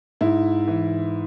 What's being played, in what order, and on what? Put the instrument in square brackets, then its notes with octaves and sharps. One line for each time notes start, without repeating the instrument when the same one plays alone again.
[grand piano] G#2 E4
E3